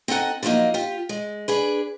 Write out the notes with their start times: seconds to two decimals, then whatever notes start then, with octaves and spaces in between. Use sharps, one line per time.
0.08 C4 D#4 A4 F#5 G#5
0.43 D3 F3 F#3 A#3 D#4
0.74 F4 G4
1.09 G#3
1.48 D4 G#4 B4